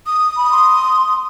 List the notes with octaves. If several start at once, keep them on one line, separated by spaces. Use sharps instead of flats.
D#6
B5
C6